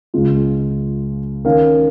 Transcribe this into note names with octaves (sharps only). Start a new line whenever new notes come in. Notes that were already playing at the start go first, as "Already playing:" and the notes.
C#2 C#3 G#3 F4
D#3 C#4 A#4 F5